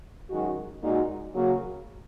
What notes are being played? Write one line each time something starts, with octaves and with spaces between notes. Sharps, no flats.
F#2 D#3 G#3 F#4
A#2 G#3 D#4 F#4
C#3 F#3 A#3 C#4 F#4